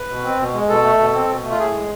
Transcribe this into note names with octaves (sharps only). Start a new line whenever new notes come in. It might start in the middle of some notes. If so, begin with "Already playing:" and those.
Already playing: B4
B2
C4
B2
G#3
B2 A4
A3
B2
C4
B2
A3
F4
A2 G#4
G#3